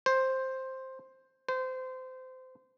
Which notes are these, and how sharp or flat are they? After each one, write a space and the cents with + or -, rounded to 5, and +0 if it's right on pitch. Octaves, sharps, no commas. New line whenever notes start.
C5 +5
C5 -25